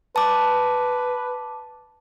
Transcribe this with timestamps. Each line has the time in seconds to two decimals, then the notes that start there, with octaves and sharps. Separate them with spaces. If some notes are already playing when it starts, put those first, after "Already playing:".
0.16 B4 A5 D6